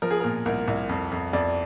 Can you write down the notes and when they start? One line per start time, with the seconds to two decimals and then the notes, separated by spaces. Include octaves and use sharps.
0.02 F3 A#4
0.11 G#4
0.20 A#2 A#4
0.46 C2 A#4
0.68 C2
0.89 F2
1.11 F2
1.33 F2 D5